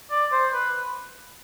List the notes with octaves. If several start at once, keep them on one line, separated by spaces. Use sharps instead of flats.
D5
C5
B4